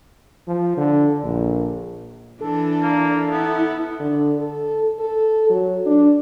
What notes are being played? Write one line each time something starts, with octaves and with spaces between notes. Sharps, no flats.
F3
D3
A#1
E3 D4 A4
A#3
B3 E4
D3
A4
A4
F#3
D4